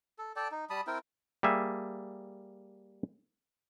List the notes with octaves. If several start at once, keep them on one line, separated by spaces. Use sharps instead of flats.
A4
A4 D5 G5 A5
D#4
G3 A5 B5 D#6
C4 E4 A#4 G5
G3 A#3 G#4 E5